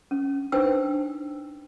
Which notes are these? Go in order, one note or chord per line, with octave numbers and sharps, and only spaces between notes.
C#4
D4 D#4 B4 C5 G5 E6